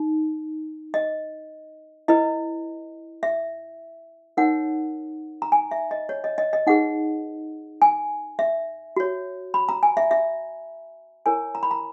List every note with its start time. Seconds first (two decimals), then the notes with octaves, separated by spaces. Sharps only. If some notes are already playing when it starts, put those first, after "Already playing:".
Already playing: D#4
0.94 D#5
2.08 E4 B4 D#5
3.23 E5
4.37 D#4 A#4 C#5 F#5
5.42 A#5
5.52 G#5
5.71 E5
5.91 D#5
6.09 C#5
6.24 D#5
6.38 D#5
6.53 D#5
6.67 D#4 G#4 B4 F#5
7.82 G#5
8.39 E5
8.96 F#4 C#5
9.54 B5
9.69 A#5
9.83 G#5
9.97 E5
10.11 E5
11.26 E4 A#4 C#5 G#5
11.55 A#5
11.63 B5
11.71 A#5